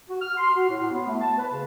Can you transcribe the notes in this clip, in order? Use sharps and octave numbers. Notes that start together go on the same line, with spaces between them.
F#4
F6
C6
F#4
A2
B3
A3
A5
B4
C#3